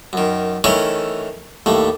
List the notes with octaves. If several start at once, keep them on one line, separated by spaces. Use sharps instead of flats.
F#2 D#3
D#3 E3 A3 C#4 C#5
D#2 A2 A3